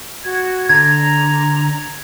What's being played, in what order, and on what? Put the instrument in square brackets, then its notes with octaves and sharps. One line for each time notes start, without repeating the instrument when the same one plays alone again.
[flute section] F#4 G#6
[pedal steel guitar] D3 [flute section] A#5 [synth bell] G#6